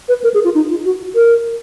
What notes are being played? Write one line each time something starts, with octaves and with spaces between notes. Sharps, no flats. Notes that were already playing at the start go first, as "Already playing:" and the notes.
B4
A#4
G#4
F4
D#4
F4
F#4
A#4